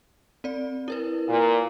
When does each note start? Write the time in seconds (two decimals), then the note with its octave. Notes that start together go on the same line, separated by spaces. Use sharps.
0.44 C4 D5
0.88 E4 A#4 B4
1.28 A#2